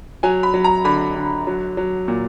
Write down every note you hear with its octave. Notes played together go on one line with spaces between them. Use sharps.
F#3 G#5
B5
F#3
A#5
D3 B5
D3
F#3
F#3
A#2